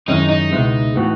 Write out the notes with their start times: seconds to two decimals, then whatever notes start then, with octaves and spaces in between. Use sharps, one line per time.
0.08 F#2 D#3 G#3 C#4 D#4 E4
0.29 D#4
0.52 C#2 B2 G#3 B3 E4
0.95 A2 E3 B3 F#4